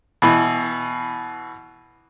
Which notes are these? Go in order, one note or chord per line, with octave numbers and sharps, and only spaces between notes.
B2 E3